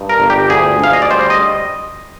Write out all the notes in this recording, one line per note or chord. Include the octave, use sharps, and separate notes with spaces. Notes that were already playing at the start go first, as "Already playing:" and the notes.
Already playing: G2 D#4
A#4
G1
G4
D2 G#4
D2 F5
D#5
D5
G3 C5
D#5